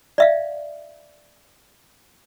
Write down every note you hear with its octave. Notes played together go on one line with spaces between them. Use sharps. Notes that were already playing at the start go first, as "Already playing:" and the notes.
D5 E5 F5